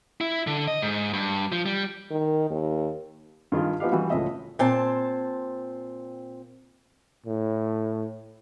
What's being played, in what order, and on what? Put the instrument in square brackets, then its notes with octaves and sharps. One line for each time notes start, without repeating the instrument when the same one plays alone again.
[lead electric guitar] E4
D3
D#5
G#2
G2
F3
G3
[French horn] D#3
D#2
[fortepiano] G2 D#3 F4 G#4
F3 B3 D#4 G4 F5
E3 G3 F#4
C#2 A2 F3 G#3 D#5 E5
[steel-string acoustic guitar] A#2 C4 A5
[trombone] A2